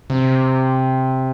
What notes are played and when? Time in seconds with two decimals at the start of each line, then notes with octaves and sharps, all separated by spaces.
0.10 C3